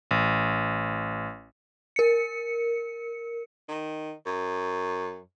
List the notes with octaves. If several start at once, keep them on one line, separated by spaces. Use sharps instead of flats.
A1
A#4 C#7
D#3
F#2